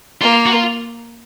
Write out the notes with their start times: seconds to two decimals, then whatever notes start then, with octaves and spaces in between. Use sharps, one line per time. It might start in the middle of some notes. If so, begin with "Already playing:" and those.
0.21 A#3 F4
0.46 F#4
0.52 F4